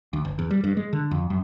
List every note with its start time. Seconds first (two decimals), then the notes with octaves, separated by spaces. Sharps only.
0.13 D2
0.25 G1
0.39 E2
0.51 G3
0.64 G2
0.77 G#3
0.93 D3
1.11 F2
1.30 F#2